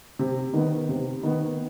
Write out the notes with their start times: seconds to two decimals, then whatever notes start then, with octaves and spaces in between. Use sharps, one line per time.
0.19 C3
0.53 D#3 B3
0.89 C3
1.23 D#3 B3